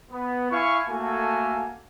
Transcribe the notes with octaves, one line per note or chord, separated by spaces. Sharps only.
B3
E4 F5 G#5 C#6
A3 A#3 F#4 A4 G#5